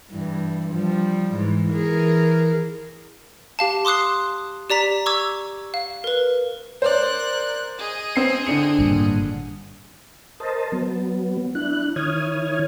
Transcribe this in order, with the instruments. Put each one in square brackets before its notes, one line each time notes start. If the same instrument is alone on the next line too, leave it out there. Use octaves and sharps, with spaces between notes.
[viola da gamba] G2 E3
F3 G3
G#2 E3
E3 G#4 A#4
[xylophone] G4 F5 A5
C6 D6 D#6 F#6 C7
G4 D5 A#5 B6
C#6 D6 E6 G#6
F5
A#4 B4
[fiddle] A#4 F#6 [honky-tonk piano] C5 D5
[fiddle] G#4 D#5
[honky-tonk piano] C4 C7
[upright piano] D3 D4 C#7
[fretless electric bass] G#1 G2 A#2
[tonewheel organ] A#4 C5 D#5 A5
F#3 B3
D4 E4 F#6
D#3 E4 C#5 D#6 F6 G#6